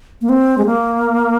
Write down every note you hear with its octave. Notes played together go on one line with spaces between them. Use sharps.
A#3
C4
G#3
A#3